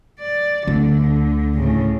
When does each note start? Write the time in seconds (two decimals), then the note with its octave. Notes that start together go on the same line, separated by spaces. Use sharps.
0.20 D5
0.67 D2 D3
1.56 A2 C#3